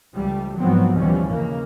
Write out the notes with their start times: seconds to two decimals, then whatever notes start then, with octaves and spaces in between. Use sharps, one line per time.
0.14 C#2 F3 G3 A3
0.57 G#2 F3 F#3 B3 C4
0.94 D#2 B2 E3 F3 G3 C#4
1.27 D#2 C#3 A#3